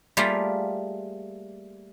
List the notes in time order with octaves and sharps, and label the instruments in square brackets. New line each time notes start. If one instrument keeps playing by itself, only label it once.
[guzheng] G3 A3 A#3 F4 G#4 D5